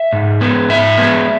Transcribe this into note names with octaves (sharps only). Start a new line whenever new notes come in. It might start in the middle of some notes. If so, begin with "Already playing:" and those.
Already playing: E5
G#2
G#3 B3
G#2 E5
G#3 B3